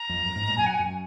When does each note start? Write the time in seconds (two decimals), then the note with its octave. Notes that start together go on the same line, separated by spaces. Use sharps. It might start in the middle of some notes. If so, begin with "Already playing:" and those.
Already playing: A#5
0.09 F2
0.25 F#2
0.36 G#2
0.47 A#2
0.57 F#2 G#5
0.66 F#5
0.74 G#5
0.79 F#2